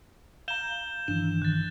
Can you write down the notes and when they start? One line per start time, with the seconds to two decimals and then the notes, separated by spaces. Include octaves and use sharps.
0.48 F5 A#5 G6 E7 G7
1.08 G2 D#3 E3 D4 E7
1.42 D#3 F#6 A6